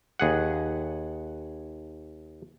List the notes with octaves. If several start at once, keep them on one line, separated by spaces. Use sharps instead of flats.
D#2 G#4 F#5